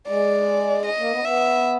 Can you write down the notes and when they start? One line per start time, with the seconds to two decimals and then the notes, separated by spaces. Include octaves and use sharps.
0.08 G#3 D5
0.86 D#5
0.98 A#3
1.11 B3
1.24 B3 E5